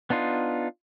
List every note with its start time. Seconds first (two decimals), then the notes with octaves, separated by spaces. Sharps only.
0.10 B3 D4 D#4 F4